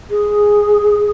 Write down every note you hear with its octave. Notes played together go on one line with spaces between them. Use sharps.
G#4